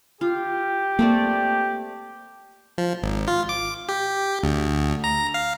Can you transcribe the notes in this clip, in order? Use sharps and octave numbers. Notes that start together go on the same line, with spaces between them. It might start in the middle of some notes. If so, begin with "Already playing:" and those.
F4 G4
A3 A#3 C4 D5
F3
G#1
F4
D6
G4
D2
A#5
F5